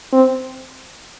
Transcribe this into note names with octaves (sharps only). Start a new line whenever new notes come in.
C4